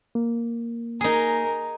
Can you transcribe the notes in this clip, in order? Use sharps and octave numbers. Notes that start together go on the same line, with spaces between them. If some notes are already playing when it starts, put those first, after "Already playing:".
A#3
D#4 G#4 A#4